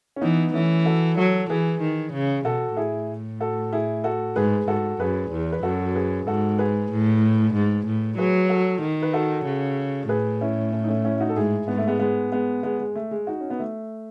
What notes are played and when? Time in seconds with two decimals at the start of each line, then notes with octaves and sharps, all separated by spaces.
0.16 C#4
0.21 E3 B3 D#4
0.54 E3 A3 C#4
0.85 F#4 A4
1.17 F#3 F#4 A4
1.50 E3 G#4 B4
1.81 D#3
2.13 C#3
2.45 B2 F#4 A4
2.77 A2 E4 G#4
3.40 F#4 A4
3.73 E4 G#4
4.04 F#4 A4
4.36 G#2 G#4 B4
4.68 G#2 F#4 A4
5.00 F#2 G#4 B4
5.31 E2
5.52 B4
5.63 F#2 F#4 A4
5.95 G#4 B4
6.27 G#2 F#4 A4
6.59 G#4 B4
6.91 A2
7.54 G#2
7.86 A2
8.18 F#3 G#4 B4
8.49 F#4 A4
8.82 D#3
9.02 B4
9.13 F#4 A4
9.46 C#3
10.09 A2 G#4 B4
10.41 C#4 E4
10.73 A3 C#4
10.84 D#4
10.88 A3 C#4
11.05 C#4 E4
11.16 E4
11.20 D#4 F#4
11.29 A4
11.36 G#2 E4 G#4
11.68 G#2 B3
11.78 A3
11.88 G#3 B3
12.00 G#3 B3
12.32 G#3 B3
12.63 G#3 B3
12.79 G#3
12.96 A3
13.11 G#3
13.27 D#4 F#4
13.41 C#4
13.50 B3
13.59 A3